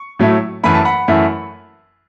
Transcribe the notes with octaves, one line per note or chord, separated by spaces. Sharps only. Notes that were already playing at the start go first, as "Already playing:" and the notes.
Already playing: C#6
A2 F#3 A3 E4
F#2 E3 A3 E4 B5
A5
F#5 B5
F#2 E3 A3 E4